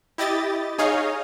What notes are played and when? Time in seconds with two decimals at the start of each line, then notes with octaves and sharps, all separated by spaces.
0.18 E4 G4 D#5 A6
0.78 D#4 G#4 C#5 D#5 F5